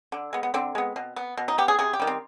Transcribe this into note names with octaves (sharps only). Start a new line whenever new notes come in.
D3
G#3 B3
B3
D3 C4
G#3 B3
B2
B3
B2
D#4
B3 G4
G#4
C3 G#4
G4
D#3 G3
C4